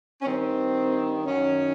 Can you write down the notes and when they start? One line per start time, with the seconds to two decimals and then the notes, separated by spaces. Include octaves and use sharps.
0.22 C#4
0.26 G2 D#3 C4
1.25 F#2 D#3 C#4